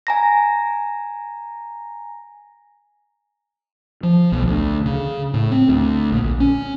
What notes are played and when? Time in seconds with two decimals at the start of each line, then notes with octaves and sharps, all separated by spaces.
0.07 G#5 A#5 A#6
4.03 F3
4.32 B1
4.44 D2
4.86 C#3
5.34 A2
5.51 C4
5.69 D2
6.12 A#1
6.40 C#4